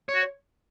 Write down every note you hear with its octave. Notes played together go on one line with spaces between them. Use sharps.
C#5
F#4